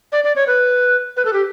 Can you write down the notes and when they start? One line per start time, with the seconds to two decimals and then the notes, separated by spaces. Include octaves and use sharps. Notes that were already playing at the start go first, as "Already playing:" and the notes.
0.12 D5
0.24 D5
0.36 C#5
0.47 B4
1.17 B4
1.25 A4
1.33 G4